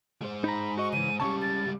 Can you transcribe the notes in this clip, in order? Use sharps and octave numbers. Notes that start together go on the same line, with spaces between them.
G#3 C5
D#4 A#5 B5
F#4 D#5 C#6
C#3 E3 D#7
C#2 C#3 G3 C#4 A5 C#6
A6